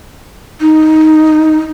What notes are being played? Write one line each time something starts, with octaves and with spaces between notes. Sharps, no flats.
D#4